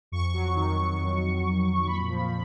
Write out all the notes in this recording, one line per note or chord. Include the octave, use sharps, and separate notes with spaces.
F2 C#6
F#3
D#3
D#3
F2
F2
F2
F2
A#2 B5
F3